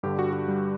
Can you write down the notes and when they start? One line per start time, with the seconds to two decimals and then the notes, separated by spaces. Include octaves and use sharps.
0.03 G2 D3 G4
0.19 F#4
0.33 F#4
0.48 G3